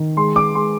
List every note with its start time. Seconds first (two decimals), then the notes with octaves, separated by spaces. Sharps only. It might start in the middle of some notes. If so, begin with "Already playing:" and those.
Already playing: D#3
0.17 G#3 C6
0.36 D6
0.54 G#3 C6